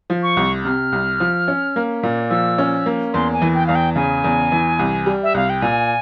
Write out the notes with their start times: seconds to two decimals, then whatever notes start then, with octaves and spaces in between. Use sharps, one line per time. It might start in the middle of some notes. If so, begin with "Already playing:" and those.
0.10 F3
0.23 C#6
0.37 C2
0.65 C3 F6
0.92 C2
1.20 F3
1.48 C#4
1.76 A#3
2.03 A#2
2.30 F3 E6
2.58 C#4
2.86 A#3
3.14 E2 C6
3.34 G#5
3.42 E3
3.55 G5
3.67 E2 F5
3.75 G5
3.96 C#3 G#5
4.24 E2
4.52 E3
4.79 C2
5.06 G3
5.23 E5
5.34 C2 F5
5.50 G5
5.62 A#2 G#5